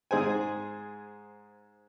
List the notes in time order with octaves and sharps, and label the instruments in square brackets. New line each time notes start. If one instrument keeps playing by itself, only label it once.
[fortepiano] G#2 G#4 C5 G#5